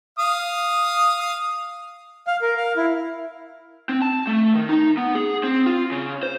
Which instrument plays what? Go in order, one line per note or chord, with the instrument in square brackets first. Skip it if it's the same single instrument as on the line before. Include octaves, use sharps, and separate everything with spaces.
[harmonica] F5 D#6
[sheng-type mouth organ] F5
A#4
F5
E4
[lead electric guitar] C4
A5
A3
D#3
D#4
B3
G#4
C4
F4
C#3
C5